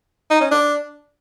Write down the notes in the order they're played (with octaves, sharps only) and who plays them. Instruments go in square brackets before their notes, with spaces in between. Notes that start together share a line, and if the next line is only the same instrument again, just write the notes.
[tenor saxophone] D#4
C#4
D4